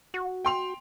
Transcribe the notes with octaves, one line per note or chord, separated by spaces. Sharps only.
F#4
G5 C6 F7